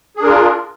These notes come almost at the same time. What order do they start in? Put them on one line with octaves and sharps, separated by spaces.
G#4 D4 A#4 F4